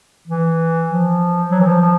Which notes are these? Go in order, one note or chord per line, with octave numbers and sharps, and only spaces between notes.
E3
F3
F#3
E3
F3
F3